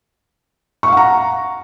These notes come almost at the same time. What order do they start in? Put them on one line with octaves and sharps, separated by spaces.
C#6 F5 F#5 A#5